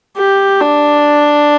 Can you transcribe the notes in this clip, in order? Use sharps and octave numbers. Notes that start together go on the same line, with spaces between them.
G4
D4